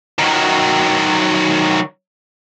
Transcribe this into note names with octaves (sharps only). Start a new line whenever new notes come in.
D#3 F#3